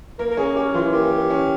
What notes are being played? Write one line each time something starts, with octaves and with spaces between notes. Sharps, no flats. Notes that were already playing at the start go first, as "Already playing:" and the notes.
A#3 A#4
A#4
C#4 G#4
C#4 G4
E3 F4
A#3 G4
A#3
C#4